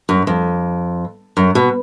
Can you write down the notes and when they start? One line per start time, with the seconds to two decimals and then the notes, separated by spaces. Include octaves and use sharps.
0.09 F#2
0.27 F2
1.37 F#2
1.55 B2